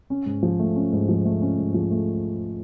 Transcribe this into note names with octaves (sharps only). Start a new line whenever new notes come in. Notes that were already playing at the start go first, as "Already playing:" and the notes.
C#4
G#2
F3
A3
C#4
G#2
F3
A3
C#4
G#2
F3
A3